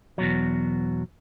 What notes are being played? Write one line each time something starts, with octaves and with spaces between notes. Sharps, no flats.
E2 B2 F#3